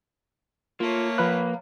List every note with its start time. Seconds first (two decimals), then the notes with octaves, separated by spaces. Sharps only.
0.80 A3 A#3 F4 C#5
1.18 F3 B4 F5 A#5 B5 F#6